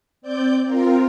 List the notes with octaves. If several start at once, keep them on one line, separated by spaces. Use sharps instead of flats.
C4 D5 G6
C4 F4 A#4